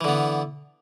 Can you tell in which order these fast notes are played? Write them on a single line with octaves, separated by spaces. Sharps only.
E3 D3 B3